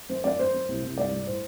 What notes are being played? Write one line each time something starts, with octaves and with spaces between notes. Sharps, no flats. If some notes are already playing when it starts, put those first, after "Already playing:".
F#2 C5
F#2 D5
F#2 C5
F#2
C2
C2
G2 D5
G2
A2 C5